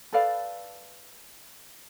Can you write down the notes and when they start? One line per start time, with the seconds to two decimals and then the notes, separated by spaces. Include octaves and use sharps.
0.13 A4 B4 D5 F5